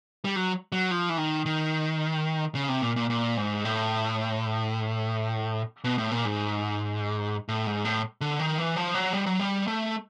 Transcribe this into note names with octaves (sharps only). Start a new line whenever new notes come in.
G3
F#3
F#3
F3
E3
D#3
D#3
C#3
C3
A#2
A#2
A#2
G#2
A2
B2
A2
A#2
G#2
A2
G#2
A2
D3
D#3
E3
F3
F#3
G3
F#3
G3
A3